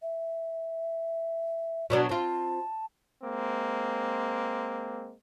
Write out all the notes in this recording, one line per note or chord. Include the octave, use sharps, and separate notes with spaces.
E5
B2 F#3 D4 D5
C4 F4 A5
G#3 A#3 C4